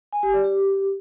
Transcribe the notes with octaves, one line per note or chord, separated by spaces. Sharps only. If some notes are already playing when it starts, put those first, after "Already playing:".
G#5
G4
D5
G4